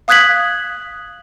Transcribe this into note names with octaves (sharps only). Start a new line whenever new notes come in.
F5 D#6 F#6 G#6 B6 F#7